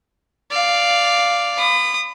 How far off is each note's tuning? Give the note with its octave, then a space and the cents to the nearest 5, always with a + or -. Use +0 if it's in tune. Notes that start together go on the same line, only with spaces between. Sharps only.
D5 +0 F5 +0
B5 +25 D#6 -25